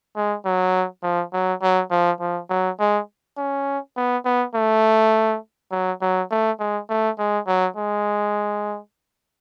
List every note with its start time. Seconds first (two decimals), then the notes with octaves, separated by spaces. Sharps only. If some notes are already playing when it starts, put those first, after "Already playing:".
0.16 G#3
0.45 F#3
1.03 F3
1.33 F#3
1.62 F#3
1.91 F3
2.20 F3
2.50 F#3
2.80 G#3
3.37 C#4
3.97 B3
4.25 B3
4.55 A3
5.72 F#3
6.02 F#3
6.31 A3
6.59 G#3
6.89 A3
7.18 G#3
7.47 F#3
7.77 G#3